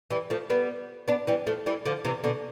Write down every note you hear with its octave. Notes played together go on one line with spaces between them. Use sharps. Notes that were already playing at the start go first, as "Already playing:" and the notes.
E3 G3
F3 A3
G3 B3
B3 D4
E3 G3
F3 A3
E3 G3
D3 F3
C3 E3
B2 D3